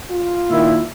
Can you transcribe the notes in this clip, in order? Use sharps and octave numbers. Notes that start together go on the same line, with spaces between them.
F4
A#2 D#3 E4